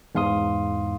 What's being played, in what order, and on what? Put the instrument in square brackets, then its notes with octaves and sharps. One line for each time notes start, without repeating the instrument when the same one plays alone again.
[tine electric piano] E2 G#2 F5 C6 D#6